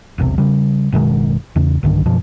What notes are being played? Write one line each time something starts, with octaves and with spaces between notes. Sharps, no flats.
E1 B1 C3
C#3 G3
F#1 B2 D#3 G#3
E2 C#3
B1 G2 D3 D#3
F#2 B2 F3